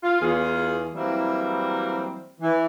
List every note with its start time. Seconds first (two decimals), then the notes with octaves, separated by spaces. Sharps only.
0.03 F4
0.21 E2 F4 G#4
0.95 E3 F#3 G3 A#3 C4 E4
2.40 E3